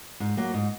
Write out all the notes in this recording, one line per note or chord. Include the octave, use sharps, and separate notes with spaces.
G#2
F#3 A#3
G#2